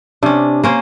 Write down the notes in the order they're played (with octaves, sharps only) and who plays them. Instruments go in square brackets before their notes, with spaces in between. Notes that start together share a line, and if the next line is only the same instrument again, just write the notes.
[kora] C3 C#4 [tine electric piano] D4
[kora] A#3 C#4 C5